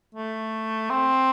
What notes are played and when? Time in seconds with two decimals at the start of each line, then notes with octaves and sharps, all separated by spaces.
0.15 A3
0.90 C4